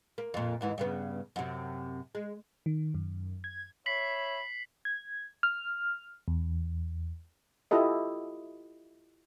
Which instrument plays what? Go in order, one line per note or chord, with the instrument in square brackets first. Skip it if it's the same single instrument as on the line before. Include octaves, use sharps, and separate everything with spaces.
[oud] A#3
F2 A#2
D#2 G#2 E3
G2 C#3 B3
F#2 C3
G#3
[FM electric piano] D#3
F#2
G#6
[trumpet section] C#5 E5 B5 [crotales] B6 C7 F#7
[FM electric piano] G#6
F6
E2
[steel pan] E4 F4 G4 A4 D#5